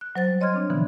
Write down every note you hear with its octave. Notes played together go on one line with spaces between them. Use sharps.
F#6
F#3 C5 A6
G3
C#5 D#5 C6 F6 G#6
C4 D4
B2 D3 E3 F3 B3